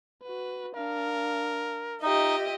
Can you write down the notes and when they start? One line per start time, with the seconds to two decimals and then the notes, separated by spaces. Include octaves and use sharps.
0.23 F#4 B4
0.76 D4 A#4 F5
2.02 D#4 F4 G4 D#5 E5